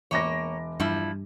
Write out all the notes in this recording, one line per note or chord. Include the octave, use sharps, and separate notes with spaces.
E1 A#3 C#5 D6 A#6
G2 F3 G3 E4